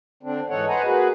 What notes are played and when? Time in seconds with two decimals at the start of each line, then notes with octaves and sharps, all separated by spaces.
0.23 D3 C4 D4
0.50 G#2 E3 D#4 A4 C#5 F#5
0.68 D#4 B4 C5 F#5 G#5 A#5
0.85 A#3 F#4 G#4 B4